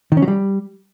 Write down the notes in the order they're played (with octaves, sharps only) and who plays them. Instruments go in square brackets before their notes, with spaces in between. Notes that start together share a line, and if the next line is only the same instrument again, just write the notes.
[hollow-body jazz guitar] D#3
C#4
F#3
G3